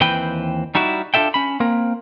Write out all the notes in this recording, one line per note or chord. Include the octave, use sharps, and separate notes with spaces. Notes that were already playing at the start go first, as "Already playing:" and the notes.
D#2 E3 C4 B4 G5
G3 D#4 E4 F#4
D4 F4 A4 E5 G5
C#4 B5
A#3 C4 A#4